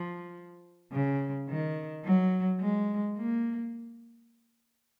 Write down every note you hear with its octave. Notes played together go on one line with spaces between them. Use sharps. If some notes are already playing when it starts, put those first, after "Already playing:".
Already playing: F3
C#3
D#3
F#3
G#3
A#3